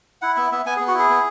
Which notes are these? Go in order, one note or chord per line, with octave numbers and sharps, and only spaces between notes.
E4 F#5
B3 E5
B3 E5
B3 G#5
G#4
B3
F#4
E4 G#4
B3